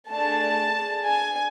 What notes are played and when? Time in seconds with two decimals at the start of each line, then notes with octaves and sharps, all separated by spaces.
0.11 A3 D4 G#4 A5
0.75 D4 G#4
1.06 G#5